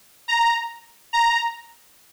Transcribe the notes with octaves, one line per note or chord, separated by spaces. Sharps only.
A#5
A#5